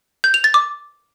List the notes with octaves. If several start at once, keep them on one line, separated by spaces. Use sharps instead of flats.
G6
F7
A6
D6